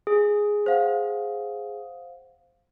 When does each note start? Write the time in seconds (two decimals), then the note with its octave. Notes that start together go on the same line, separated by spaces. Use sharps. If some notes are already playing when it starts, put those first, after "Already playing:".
0.07 G#4
0.66 C5 F5 F#5